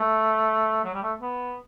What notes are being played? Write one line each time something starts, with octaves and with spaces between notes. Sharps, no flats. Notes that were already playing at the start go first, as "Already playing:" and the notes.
Already playing: A3
F#3
G3
A3
B3